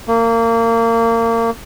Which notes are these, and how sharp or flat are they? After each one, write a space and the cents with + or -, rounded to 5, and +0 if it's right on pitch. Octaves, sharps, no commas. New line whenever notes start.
A#3 -25